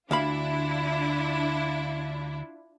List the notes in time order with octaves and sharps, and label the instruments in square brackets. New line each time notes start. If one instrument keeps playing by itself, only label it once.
[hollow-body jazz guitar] D2 F5 B5 [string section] D4 E4 F4